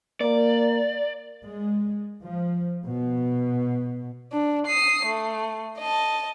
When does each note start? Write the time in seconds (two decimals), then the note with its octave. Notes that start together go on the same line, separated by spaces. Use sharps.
0.21 A#3 D5
1.44 G#3
2.22 F3
2.85 B2
4.32 D4
4.66 D#6 C7
5.06 A3
5.79 D#5 A5